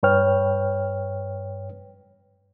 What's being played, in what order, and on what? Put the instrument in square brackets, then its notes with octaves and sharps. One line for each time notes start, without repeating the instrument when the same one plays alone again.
[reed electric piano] G2 B4 C#5 G5 F6